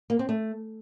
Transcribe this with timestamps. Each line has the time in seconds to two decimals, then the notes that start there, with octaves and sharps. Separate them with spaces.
0.10 A#3
0.19 C4
0.29 A3